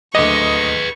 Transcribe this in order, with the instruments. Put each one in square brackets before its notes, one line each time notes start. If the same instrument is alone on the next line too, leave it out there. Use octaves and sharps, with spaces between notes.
[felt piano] D2 D6 [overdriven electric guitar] G#4 B4 [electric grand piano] D#5 [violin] C#6